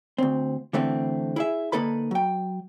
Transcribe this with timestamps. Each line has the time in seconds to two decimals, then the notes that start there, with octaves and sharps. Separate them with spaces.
0.18 D2 C4
0.73 D3 E3 A3 C4
1.36 E4 G#4 E5
1.72 D3 A#3 D#4 A4 B4 B5
2.11 F#3 G5